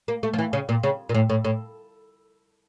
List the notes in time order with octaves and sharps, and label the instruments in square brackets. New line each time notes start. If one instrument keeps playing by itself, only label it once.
[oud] A#3
A3
F3
E3
C#3
A#2
C#3
A#2
A2
A2
A2